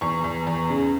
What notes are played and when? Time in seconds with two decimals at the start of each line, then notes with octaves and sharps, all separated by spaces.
0.01 E2 C#6
0.24 E2
0.47 E2
0.70 C#3